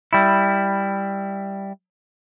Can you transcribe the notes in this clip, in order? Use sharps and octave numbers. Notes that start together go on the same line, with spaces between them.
G3 E4